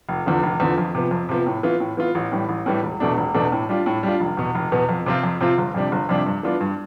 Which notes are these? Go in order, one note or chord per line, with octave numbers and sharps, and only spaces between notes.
F1
E2 D3 F3
F1
E2 D3 F3
F2
C3 F3 B3
F2
C3 F3 B3
A2
E3 B3 F4
A2
E3 B3 F4
A1
A2 E3 G3
A1
A2 E3 G3
E1
E2 B2 A3 D4
E1
E2 B2 A3 D4
A2
G3 D4 F4
A2
G3 D4 F4
F1
E2 B2 B3
F1
E2 B2 B3
F2
C3 F3 C4 F4
F2
C3 F3 C4 F4
G1
F2 C3 G3 D4
G1
F2 C3 G3 D4
G2
E3 B3 D4 F4
G2